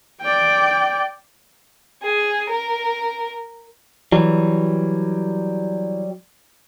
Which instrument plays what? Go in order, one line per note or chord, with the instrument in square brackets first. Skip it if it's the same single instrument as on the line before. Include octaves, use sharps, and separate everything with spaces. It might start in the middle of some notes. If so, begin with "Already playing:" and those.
[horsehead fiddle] D5 G5
[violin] G#4
A#4
[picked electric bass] E3 [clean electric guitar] F#3 G3